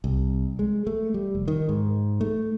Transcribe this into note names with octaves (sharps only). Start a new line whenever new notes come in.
C2
G#3
A3
G3
F1
D#3
G#2
A3